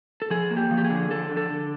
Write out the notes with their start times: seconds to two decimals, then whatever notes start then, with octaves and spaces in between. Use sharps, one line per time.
0.22 A4
0.30 F3 G#4
0.51 A#3
0.57 G4
0.71 F3
0.78 G4
0.84 G#4
0.90 D3
1.10 F3 A4
1.31 D3
1.37 A4
1.50 D3